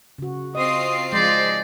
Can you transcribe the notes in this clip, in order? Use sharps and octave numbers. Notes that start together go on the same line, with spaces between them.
C#3 F#4
C4 F4 D#5 D#6 C7
F3 G#3 D#4 C5 D5